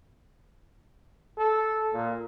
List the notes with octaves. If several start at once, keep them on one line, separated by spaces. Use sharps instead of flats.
A4
A#2